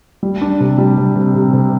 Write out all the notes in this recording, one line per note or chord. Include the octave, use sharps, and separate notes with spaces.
G3
D4
C3
G3
C3
C3
C3
C3